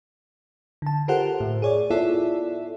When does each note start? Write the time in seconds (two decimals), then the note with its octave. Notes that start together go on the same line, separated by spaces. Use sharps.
0.82 D3 A5
1.08 F4 G4 A4 A#4 C5 F#5
1.40 A2
1.62 G#4 C#5 D5
1.90 B3 E4 F4 A4 D5 E5